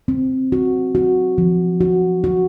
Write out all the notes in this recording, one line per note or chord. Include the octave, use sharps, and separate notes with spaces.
C4
F#4
F#4
F3
F#4
F#4